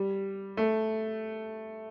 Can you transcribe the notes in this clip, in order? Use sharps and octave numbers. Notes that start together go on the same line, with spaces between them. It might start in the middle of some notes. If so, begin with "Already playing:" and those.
Already playing: G3
A3